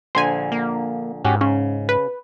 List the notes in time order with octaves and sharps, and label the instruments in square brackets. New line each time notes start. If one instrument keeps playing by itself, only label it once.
[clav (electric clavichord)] A#1 D3 [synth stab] C5 G#5
[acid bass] A#3
[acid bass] G#2 [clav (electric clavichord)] C#4 F#4 G4
[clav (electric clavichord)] C#3 [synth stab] C#4
[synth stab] B4